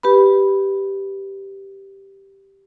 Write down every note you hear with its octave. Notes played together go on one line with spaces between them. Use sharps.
G4 B4 B5